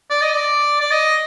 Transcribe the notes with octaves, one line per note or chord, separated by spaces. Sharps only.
D5
D#5
D5
D5
D#5